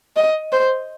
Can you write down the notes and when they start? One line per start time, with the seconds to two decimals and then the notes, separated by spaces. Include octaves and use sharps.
0.16 D#5
0.52 C5